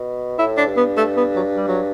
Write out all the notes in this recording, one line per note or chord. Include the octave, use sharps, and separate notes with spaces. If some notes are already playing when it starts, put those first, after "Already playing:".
Already playing: B2
A2 E4
D4
G2
B3
A3
B3
F#3
G3
F#3